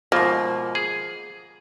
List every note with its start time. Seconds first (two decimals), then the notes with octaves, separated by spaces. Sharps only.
0.12 G#2 B2 F3 A#3
0.75 G#4